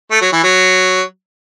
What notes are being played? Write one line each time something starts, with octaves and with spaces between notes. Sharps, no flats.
A3
F#3
E3
F#3